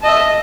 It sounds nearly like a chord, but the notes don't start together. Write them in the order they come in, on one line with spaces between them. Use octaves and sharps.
A5 D#5 E5